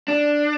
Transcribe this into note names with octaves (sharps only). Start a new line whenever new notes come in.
D4